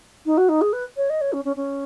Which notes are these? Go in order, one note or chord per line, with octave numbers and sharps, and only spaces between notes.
D#4
F#4
D#4
G#4
B4
C#5
D#5
C#5
C#4
C#4
C#4